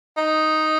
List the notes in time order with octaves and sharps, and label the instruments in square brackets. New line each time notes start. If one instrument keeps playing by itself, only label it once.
[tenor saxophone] D#4